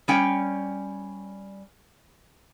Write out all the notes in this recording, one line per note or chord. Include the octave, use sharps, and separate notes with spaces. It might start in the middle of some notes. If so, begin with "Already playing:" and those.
G3 C#4 G5